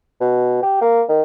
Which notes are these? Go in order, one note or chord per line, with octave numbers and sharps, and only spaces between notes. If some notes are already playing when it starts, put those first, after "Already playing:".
B2
G4
A#3
D#3